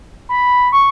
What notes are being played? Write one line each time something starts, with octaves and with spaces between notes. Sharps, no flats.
B5
C#6